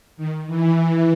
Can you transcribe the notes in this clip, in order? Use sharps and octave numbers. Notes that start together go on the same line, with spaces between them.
D#3
E3